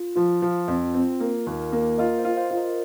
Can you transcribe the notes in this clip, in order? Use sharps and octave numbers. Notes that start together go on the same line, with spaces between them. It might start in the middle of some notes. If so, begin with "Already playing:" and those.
Already playing: F4
F3 F4
F3
F2
C4
A#3
D#2
A#3
F4 A#4 D#5
C5 F5
F4
C5 F5
F4
A#4 D#5